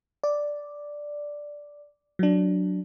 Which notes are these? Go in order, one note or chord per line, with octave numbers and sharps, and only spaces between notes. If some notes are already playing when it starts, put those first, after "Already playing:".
D5
F#3 D4